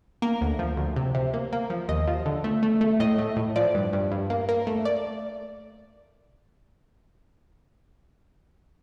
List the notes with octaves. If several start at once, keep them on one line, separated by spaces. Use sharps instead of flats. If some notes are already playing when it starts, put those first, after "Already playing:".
A#3 A#4
D2
F3
D2
C3
C3
A#3
A#3
F3
D#2 D#5
F3
D3
A3
A3
A3
A2 D#5
A3
A2
F3 D5
G2
G2
G2
A#3
A#3
A3
D5